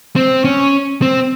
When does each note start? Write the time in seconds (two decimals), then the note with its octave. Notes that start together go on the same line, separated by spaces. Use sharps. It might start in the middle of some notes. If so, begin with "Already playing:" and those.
0.16 C4
0.45 C#4
1.02 C4